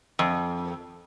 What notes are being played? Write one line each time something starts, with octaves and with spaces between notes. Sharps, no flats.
F2